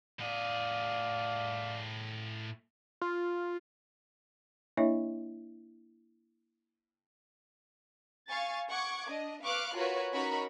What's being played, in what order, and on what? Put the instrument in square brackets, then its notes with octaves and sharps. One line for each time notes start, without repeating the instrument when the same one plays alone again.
[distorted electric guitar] A2 G#4 [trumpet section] D5 F5
[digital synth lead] F4
[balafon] A#3 D4 E4 C#5 D#5 E5
[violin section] F5 G#5 C#6 A6
F#5 C#6 D6 G#6
D4 D#5
B4 F5 C#6 D6 F6 F#6
F4 F#4 A#4 B4 C#5
C#4 D#4 F#4 A#4 B5 C#6